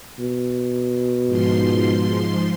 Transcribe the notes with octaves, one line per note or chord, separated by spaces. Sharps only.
B2
G#2 F3 C6